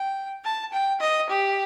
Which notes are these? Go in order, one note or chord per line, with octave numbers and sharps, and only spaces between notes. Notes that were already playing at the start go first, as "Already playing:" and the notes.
Already playing: G5
A5
G5
D#5
G4